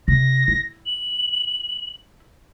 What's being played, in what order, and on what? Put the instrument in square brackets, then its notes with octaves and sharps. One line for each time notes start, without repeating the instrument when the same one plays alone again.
[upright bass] C3 [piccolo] A#6
[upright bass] E4
[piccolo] F#7